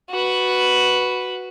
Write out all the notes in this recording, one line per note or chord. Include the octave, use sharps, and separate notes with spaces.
F#4 B4